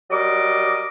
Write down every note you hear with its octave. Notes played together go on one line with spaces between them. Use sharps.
F#3 G3 A#4 D#5 D6